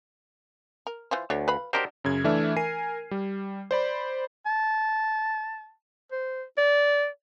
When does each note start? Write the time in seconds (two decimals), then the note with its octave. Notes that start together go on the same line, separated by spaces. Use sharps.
0.87 A#4
1.11 E3 F4 C5
1.30 D2 D4 A4 C#5
1.48 B4 F5 B5
1.73 F#3 D4 D#4 G4 A#4 C5
2.04 F#2 C#3 G#6
2.24 E3 A3 D4 E5 F6
2.56 A#4 G#5 C7 D#7
3.11 G3
3.71 C5 D5 B5
4.46 A5
6.12 C5
6.58 D5